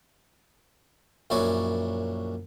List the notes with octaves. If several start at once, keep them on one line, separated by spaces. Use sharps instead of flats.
A#1 F#2 E4 C#5 D5 G#5